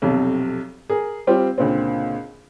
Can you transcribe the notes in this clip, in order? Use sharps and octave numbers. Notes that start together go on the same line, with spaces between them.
B1 F2 C3
G#4 A#4
G3 C4 F4 G4
C#2 A#2 D3 C4